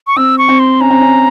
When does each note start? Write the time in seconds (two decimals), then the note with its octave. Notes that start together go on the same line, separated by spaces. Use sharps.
0.07 C#6
0.17 C4 E6
0.38 C#6
0.49 C4
0.59 C6
0.80 C#4 A#5
0.91 C4
1.01 C#4